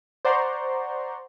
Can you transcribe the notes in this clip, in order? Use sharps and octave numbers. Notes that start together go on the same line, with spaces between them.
C5 D5 F#5 A#5 C6 C#6